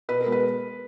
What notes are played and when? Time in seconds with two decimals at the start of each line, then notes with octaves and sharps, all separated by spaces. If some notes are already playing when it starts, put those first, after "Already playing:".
0.09 B2 B4
0.21 A#4
0.26 G#3 B3
0.32 B4